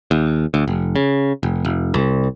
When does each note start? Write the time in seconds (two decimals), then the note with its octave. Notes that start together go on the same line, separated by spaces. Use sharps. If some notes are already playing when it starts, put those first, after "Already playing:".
0.11 D#2
0.54 D2
0.68 F1
0.96 C#3
1.43 F1
1.65 F1
1.94 C2